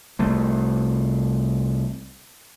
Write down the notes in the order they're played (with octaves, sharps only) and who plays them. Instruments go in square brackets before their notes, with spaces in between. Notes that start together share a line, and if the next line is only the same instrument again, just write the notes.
[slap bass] C2 A3